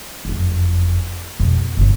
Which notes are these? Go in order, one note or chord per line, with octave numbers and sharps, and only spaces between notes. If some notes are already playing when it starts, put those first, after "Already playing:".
F#1 F2
E1 F2
G1 C#3